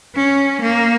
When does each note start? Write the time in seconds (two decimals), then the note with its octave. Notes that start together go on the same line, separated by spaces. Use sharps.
0.15 C#4
0.62 A#3